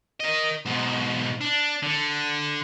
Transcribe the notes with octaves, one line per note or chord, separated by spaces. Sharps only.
A#4 D#5
G#2 B2
D4
D3